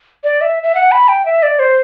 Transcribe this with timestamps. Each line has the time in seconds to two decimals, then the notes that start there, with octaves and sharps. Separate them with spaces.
0.24 D5
0.41 E5
0.63 E5
0.75 F#5
0.92 B5
1.08 G5
1.26 E5
1.43 D5
1.59 C5